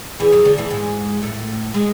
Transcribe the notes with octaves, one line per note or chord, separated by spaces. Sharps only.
E2 E3 G#4
F#2 F#3
D2 D3
E2 E3
G#2 G#3
A2 A3
G#3